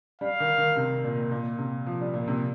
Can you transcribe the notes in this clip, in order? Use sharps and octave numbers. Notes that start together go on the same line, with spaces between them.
G3 F5
D#3
D#3
C3
A#2
A#2
C3
F3
G3
A#2
C3